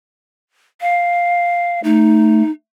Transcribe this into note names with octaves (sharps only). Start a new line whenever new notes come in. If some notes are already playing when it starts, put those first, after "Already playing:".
F5
A3 D#4